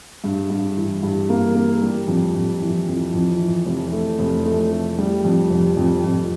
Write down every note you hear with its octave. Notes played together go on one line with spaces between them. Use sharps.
G2
G2
E3
G2
A#3
A#3
G3
F2
F2
E3
F2
F2
E3
F1
A3
F1
A3
A3
G3
F2
F1
F2
F2